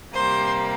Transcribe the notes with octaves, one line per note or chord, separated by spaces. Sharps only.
C3 G3 A#3 C5